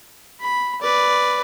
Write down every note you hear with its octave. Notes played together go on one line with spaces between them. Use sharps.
B5
B4 D5